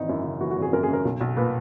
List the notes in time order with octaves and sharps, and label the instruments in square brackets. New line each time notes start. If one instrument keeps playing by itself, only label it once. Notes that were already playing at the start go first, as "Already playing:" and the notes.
Already playing: [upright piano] G#1 E3 D#4
F#2 E4
C#3
E3 F#4
F#4
G#1
G#4
F#2 A#4
C#3 G#4
A#4
B1
B1
A#2 B4